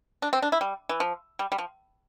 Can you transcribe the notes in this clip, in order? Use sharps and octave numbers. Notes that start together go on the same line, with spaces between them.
D4
C4
D4
E4
G3
E3
F3
G3
G3
F3